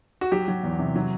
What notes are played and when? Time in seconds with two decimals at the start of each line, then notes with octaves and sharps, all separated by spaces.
0.21 F#4
0.32 F#3 G4
0.48 F#3
0.63 E2
0.79 C3
0.96 F#3